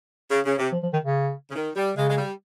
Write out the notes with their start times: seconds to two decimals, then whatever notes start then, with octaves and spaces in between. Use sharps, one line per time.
0.31 C#3
0.45 C#3
0.58 C3
0.73 F3
0.83 F3
0.93 D#3
1.03 C#3
1.50 C#3
1.55 D#3
1.76 G3
1.96 C#3 G#3
2.09 G#3
2.17 G3